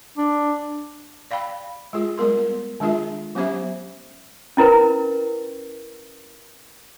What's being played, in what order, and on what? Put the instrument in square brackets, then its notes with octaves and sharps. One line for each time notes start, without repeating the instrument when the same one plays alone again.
[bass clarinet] D4
[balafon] D5 F5 G5 B5
G#3 F4 G#4
G3 G#3 B3 A#4 C6
B3
D#3 G#3 D4 F4 G#4 E5
F#3 B3 C#4 G4 C5 E5
[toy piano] C#4 E4 A#4 B4